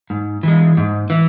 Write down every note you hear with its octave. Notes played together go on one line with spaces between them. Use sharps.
G#2
E3 G#3
G#2
E3